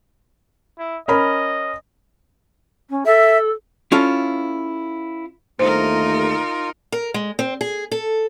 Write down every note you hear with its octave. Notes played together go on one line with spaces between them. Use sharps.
E4
C#4 A#4 D#5 B5
C#4
A4 E5
C#4 E4 F4 A4
G1 D#2 A3 D#4 F4 A#4 C5
A#4
G#3
C4
G#4
A4